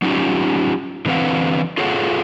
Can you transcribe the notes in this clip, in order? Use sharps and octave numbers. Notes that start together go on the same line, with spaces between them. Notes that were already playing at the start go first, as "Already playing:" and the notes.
F#3 C#4 D#4 F4 G4
D3 E3 C4 B4 F5 F#5
F4 G#4 A4 C#5 F5 F#5